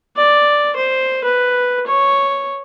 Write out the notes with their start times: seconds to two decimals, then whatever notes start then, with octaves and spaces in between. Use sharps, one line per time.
0.17 D5
0.76 C5
1.25 B4
1.87 C#5